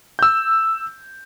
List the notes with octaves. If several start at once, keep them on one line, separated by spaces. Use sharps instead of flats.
E6 G6